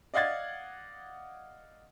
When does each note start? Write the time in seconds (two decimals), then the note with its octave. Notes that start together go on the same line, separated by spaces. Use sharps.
0.14 D5 D#5 F5 F#5 G#6 A6